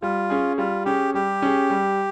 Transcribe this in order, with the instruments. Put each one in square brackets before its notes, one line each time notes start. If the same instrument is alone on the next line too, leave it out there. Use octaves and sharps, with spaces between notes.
[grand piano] G3 [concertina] F4
[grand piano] C#4 G#4
[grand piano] G3 [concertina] F4
[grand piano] C#4 G#4 [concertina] G4
[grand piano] G3 [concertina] G4
[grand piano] C#4 G#4
G3